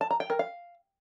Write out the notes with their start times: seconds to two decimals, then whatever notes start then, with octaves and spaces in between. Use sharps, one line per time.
0.01 A5
0.11 A#5
0.20 G5
0.30 A#4
0.39 F5